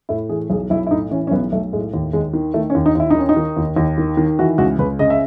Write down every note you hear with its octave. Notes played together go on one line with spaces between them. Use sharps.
A2 E4
E3 G#4
B1 G#4
B1 E4
E4
A2 D#4
E3 C#4
C#4
B1 B3
B1 A3
A2 G#3
D#2
D#2 G#3
D#3
D#3 A3
C#4
D#2
D#4
D#2 E4
D#4
D#3 C#4
D#4
D#3
D#2
D#2
D#3
D#3
E3 F#4
C#2 F#4
C#2 B4
C#3 D#5
E5